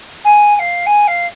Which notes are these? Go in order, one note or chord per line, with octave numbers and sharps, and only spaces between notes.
G#5
G#5
F5
G#5
F5